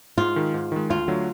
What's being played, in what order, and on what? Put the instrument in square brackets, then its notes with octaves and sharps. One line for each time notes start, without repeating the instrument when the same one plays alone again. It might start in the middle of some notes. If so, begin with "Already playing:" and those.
[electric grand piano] G#2 [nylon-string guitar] F4
[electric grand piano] D#3 G#3
G#2
D#3 G#3
[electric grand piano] D2 [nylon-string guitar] F4
[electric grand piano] D3 F#3 A3